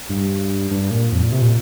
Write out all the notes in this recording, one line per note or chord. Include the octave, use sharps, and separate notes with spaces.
G2
G2
A#2
F2
A#2
C3
A#2